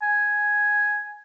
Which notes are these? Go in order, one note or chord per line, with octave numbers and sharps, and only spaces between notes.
G#5